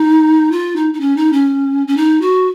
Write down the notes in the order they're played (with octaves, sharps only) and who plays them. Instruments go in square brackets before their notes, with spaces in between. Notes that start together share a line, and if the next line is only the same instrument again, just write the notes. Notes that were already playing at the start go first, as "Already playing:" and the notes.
Already playing: [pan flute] D#4
F4
D#4
D#4
C#4
D#4
C#4
C#4
D#4
F#4